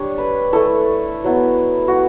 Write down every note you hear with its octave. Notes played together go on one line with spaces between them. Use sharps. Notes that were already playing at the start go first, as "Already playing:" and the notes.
Already playing: G3 D4 C#5
B4
A3 E4 A4
F#3 B3 E4
F#4